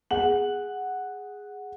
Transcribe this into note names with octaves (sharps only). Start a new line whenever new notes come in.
G#4 F#5 F#7